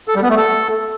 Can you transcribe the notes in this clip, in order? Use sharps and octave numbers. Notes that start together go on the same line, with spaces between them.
A4
G3
B3
A3
A4